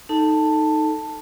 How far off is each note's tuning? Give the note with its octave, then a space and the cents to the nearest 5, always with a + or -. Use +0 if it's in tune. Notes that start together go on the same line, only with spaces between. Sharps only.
D#4 +0 A4 +0 A5 +10